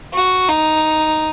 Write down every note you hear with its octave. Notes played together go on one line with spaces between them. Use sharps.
F#4
D#4